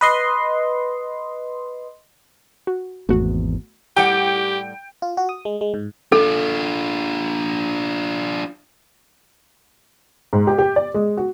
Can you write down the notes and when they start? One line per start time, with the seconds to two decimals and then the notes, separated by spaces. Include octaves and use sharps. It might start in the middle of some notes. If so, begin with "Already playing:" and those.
0.01 B4 D#5 C6
2.67 F#4
3.09 G#1 E2 A3 B3 F#4
3.97 A2 G3 G4 F#5 G5
5.02 F4
5.17 F#4
5.29 D#6
5.45 G#3
5.61 G#3
5.74 G#2
6.12 D4 F4 A4
10.33 G#2
10.47 G4
10.59 G4
10.76 D5
10.94 G#3
11.17 F#4